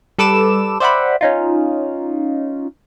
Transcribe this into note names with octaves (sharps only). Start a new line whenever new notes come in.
G3 A4 B4 D6 E6 E7
C5 D5 E5 F#5 G5 B5
C#4 D#4 F4